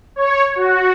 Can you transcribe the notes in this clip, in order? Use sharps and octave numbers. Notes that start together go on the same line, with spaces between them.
C#5
F#4